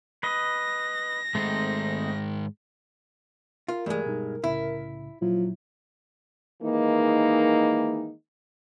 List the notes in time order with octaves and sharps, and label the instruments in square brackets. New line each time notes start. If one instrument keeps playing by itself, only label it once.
[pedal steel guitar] B4 D#5 [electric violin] A#6
[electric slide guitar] G#2 D#3 G#3 [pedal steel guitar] A3 C4 D#4
[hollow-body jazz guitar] F4 [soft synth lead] A#4
[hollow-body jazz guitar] G2 G#3 [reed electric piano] E3 A3 D5
[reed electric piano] B2 G3 D#4
[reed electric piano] C2 A2 C#3 [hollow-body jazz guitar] E4
[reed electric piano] A#2 E4 [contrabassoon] F3 [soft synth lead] F#3
[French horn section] D#3 E3 G#3 A#3 D#4